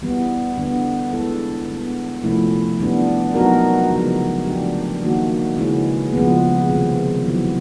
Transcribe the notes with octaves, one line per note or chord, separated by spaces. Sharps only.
E3 G3 B3
D3 G3 B3
G#3 B3 E4 A4
D3 G3 B3
C3 F3 A3 C#4 E4
E3 G3 B3 D4
F#3 B3 D#4 F#4 A#4
C#3 F3 G#3 B3
F3 A3 D4 G4
D#3 G3 A#3 D#4 F#4
C#3 E3 G#3 C#4 E4
C#3 F3 G#3 B3
C3 D#3 G3 C4
D#3 F#3 B3 E4